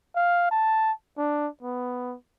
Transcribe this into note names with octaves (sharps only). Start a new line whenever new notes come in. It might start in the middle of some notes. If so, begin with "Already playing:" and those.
F5
A5
D4
B3